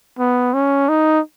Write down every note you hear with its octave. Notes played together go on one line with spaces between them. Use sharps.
B3
C#4
D#4